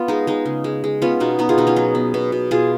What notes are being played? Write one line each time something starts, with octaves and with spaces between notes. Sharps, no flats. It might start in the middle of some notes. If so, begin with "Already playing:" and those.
Already playing: B3 F4
G#3 D#4
G#3 D#4
C#3
G#3
G#3
B3 C#4 F4
B2 D#4 F#4
B3 D#4 F#4
F4 G#4
B2 D#4 F#4
C#4 F4
F#3 D#4
B3
B2
B2
B2 F4 G#4